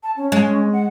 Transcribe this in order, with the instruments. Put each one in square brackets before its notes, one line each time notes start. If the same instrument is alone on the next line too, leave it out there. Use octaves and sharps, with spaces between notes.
[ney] A5
C#4
[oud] G#3
[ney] F#5